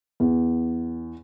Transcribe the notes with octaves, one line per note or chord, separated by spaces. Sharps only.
E2